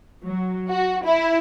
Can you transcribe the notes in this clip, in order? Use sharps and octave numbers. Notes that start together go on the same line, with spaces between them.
F#3
F#4
E4